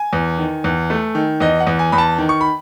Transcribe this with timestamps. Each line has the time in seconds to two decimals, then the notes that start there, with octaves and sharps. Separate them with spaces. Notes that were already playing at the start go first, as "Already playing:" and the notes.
Already playing: G#5
0.13 E2
0.38 D#3
0.64 E2
0.90 A3
1.15 D#3
1.40 E2 D#5
1.60 F#5
1.67 E2
1.79 G#5
1.92 E2 B5
1.98 A5
2.18 D#3
2.29 C#6
2.41 B5